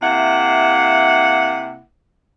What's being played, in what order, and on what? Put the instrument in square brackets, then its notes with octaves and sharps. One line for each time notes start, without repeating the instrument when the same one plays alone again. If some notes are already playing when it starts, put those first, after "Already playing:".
[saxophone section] C3 A#3 E4 E5 F#5